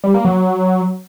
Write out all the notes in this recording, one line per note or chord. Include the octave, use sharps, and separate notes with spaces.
G3
A#3
F#3